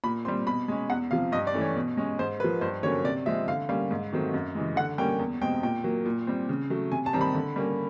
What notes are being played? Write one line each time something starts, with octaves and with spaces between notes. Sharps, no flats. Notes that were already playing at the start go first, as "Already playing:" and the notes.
A#2 B5
G3 C4 C6
B2 B5
G#3 C#4
E2 F#5
C3 F3 F5
G2 D#5
D5
E3 A3 C#4
C#5
B2
G#3 C#4
G#2 C5
F3 A#3 B4
G2 C5
D3 F#3 A#3 C#4 C#5
C3 D5
F3 G#3 C4 E5
D3 F5
G3 A#3 C#4 F5
G#2
D#3 F#3 A3 C4
F#2
C#3 E3 G#3
D3 F#5
G3 A#3 C#4 G5
E2
B2 G#3 C4 G5
A#2 G5
F#3 A#3
A#2
G3 C4
C#3
F#3 A3
C3 G#5
A5
D#3 G3 C4 A#5
B5
D3
G3 A#3 C#4